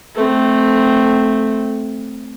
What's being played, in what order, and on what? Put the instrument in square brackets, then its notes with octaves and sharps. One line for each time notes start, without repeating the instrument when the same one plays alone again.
[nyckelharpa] A3 C4